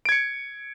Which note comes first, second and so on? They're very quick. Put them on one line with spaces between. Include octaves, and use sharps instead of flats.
D7 G#6 C#7